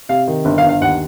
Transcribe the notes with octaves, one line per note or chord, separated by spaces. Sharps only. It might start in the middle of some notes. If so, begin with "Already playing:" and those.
C3 F5
D#3
G1
F5
G1
F5
D#2 F#5